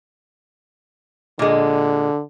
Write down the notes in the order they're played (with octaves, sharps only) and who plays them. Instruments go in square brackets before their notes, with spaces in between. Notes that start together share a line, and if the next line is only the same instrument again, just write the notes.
[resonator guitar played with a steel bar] A#2 G#3 [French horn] D3